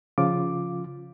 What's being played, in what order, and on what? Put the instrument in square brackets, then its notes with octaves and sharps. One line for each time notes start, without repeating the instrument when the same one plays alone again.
[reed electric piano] C#3 F3 F4 D6